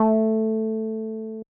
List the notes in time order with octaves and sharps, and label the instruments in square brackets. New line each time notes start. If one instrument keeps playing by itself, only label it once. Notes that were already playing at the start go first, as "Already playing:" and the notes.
Already playing: [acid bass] A3